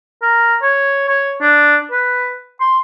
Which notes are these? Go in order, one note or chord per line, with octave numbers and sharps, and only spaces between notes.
A#4
C#5
C#5
D4
B4
C6